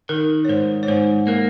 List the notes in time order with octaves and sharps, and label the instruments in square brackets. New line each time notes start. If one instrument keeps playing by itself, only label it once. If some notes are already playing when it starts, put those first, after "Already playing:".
[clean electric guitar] D#3 [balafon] A#4
[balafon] C#5
[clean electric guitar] G#2 [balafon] C5
[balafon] C#5
[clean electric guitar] G#2 [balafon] C5
[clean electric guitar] A#3 [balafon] A#4